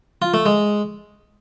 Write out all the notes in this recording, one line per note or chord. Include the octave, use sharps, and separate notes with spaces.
F4
A3
G#3